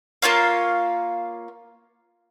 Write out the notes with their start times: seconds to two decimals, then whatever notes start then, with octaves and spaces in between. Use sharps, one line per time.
0.22 A#3 F4 C#5 F5